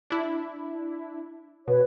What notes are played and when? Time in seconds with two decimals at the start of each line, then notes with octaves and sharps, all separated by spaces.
0.10 D4 E4
1.68 B2 F#4 B4 C#5